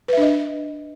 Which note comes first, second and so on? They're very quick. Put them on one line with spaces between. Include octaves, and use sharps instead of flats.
B4 E5 D4 D#5